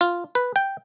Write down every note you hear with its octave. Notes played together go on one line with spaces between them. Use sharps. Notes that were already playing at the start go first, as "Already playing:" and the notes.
F4
B4
G5